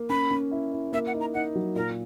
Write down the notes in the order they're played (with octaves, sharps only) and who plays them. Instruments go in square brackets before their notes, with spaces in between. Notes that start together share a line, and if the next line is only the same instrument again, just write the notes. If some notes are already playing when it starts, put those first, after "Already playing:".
Already playing: [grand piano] A#3
[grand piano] C#4 [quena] B5
[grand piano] C#4
E4
E4
[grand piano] A#3 [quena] E5
[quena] F#5
[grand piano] D#4
[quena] A#5
[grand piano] D#4 [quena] F#5
[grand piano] F#3
[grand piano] A#2 [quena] A#4